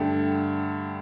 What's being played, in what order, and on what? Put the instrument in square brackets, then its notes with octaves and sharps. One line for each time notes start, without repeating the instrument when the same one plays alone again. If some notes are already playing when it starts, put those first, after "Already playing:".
Already playing: [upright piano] G2 D3 A3 G4